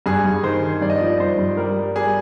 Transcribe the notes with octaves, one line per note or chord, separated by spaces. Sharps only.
G2 G#4
G2
D#3 C5
D#3
G2 D5
D#5
D5
F3
G2 C5
G2
G3 A#4
G3
G3 G#4